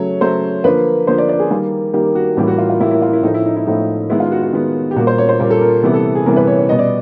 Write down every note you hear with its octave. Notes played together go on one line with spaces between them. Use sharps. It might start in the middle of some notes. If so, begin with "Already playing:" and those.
Already playing: C#3 F#3 A3 C#5
C#3 F#3 A3 C5
D3 F3 A#3 B4
D3 F3 A#3 C5
D5
D5
G#4
D#3 G3 A#3
D#3 G3 A#3 G4
F#4
A2 E3 G3 A#3 G4
F#4
F4
F4
A2 E3 G3 A#3 E4
E4
F4
E4
A2 F3 A3 D#4
E4
D#4
E4
A2 F3 A3 D#4
D#3 G#3 B3 E4
F4
F#4
F#4
D#3 G#3 B3
G4
A#2 G3 A#3 F#4
C5
C#5
C5
A#2 G3 A#3
A4
A#4
C3 E3 G3 B3
A4
G#4
C3 E3 G3 B3 A#4
B4
C#5
C#5
B2 G3 B3 D#5
D5